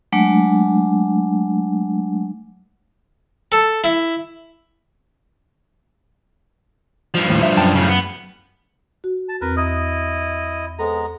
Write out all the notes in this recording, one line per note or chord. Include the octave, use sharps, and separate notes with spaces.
F#3 G#3 A3 D4
A4
E4
G2 F3
D#2 A2
E5
F#2 G5 A5
A2 C#3
B3
F#4
A5
E2 C4 A#4 B4
E4 D#5 D#6
G#3 B3 A4 C5 A#5